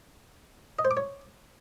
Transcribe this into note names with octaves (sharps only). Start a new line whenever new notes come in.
D#5
C5
D6
C#5